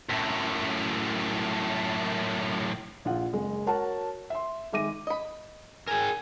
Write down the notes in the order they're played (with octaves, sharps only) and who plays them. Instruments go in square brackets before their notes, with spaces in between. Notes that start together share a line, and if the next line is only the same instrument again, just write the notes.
[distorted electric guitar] F#2 A2
[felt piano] A#1 F4 F#5
F#1 G#3
F#4 A#4 C#5 F#5 A5
E5 C6
D#3 G#3 E5 D6 A#6 D#7
[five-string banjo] D#5 B5
[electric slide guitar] G#4 A#4 [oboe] G#5